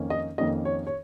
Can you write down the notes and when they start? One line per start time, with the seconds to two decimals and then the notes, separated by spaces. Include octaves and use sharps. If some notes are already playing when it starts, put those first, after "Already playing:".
Already playing: F2 D#3 A#3 C#4
0.10 D#5
0.38 F2 D#3 A#3 C#4 D#5
0.65 C#5
0.87 C#5